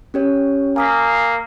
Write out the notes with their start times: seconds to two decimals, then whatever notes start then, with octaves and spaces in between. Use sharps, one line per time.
0.14 C#4 G4 C#5
0.76 A#3 G#5 D#6 B6